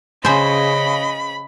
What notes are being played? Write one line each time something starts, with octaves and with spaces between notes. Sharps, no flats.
C#3 G#4 C5 D#5 B5